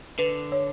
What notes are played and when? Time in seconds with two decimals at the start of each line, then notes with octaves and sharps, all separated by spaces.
0.19 D3 B4
0.52 C#5